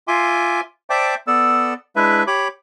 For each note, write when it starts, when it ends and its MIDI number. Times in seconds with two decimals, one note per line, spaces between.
0.08 0.61 65
0.08 0.61 76
0.08 0.61 80
0.08 0.61 84
0.08 0.61 86
0.90 1.15 72
0.90 1.15 74
0.90 1.15 76
0.90 1.15 79
0.90 1.15 81
0.90 1.15 86
1.27 1.74 59
1.27 1.74 69
1.27 1.74 74
1.27 1.74 88
1.96 2.23 56
1.96 2.23 62
1.96 2.23 64
1.96 2.23 71
1.96 2.23 76
2.27 2.48 67
2.27 2.48 73
2.27 2.48 83
2.27 2.48 86